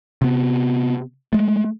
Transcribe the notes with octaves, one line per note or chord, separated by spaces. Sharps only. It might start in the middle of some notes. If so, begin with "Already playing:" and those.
C3 B3
G#3 A3